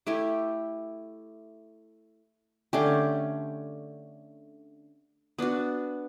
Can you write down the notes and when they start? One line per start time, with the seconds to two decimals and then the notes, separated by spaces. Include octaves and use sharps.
0.07 A3 E4 G4
2.73 D3 A3 C#4 G4
5.39 B3 D4 F#4